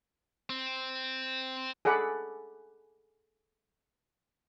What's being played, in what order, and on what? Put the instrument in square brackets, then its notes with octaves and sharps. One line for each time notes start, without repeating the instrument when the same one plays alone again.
[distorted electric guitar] C4
[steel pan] G#4 A4 D5 F#5 B5